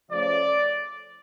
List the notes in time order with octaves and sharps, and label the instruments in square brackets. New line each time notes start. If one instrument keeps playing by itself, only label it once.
[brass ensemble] C#3 F3 A3 D5